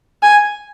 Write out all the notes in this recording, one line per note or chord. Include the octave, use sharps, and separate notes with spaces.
G#5